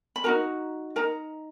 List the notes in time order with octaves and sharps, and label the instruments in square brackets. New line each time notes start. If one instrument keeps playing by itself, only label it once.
[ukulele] B5
D#4 F#4 A#4 A#5
D#4 A#4 A#5